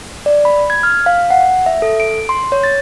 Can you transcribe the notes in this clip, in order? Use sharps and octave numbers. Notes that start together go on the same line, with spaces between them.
D5
B5
G#6
F6
F5
F#5
E5
A4
D7
C6
C#5
A6